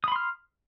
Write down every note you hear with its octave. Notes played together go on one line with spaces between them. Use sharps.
B5 C6 D#6 F6